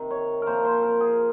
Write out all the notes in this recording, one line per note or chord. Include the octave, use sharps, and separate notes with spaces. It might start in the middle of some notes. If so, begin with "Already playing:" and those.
Already playing: C3 D#3
C#5
A#2 F3 A#4 C5
C5
A#4
G#4